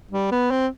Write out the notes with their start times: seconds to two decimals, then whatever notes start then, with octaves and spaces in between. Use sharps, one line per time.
0.11 G3
0.31 B3
0.51 C4